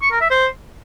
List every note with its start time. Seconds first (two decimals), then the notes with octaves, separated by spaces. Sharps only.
0.02 C#6
0.11 A#4
0.21 E5
0.30 C5